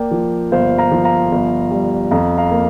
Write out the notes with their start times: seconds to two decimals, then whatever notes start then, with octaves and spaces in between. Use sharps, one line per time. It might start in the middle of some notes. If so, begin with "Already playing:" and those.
Already playing: A#3 D5 G5
0.11 F3
0.52 G1 C5 F5
0.78 F5 A#5
0.92 F3
1.04 F5 A#5
1.32 G1
1.71 G3
2.11 F2 F5 A#5
2.38 F5 A#5
2.51 A#3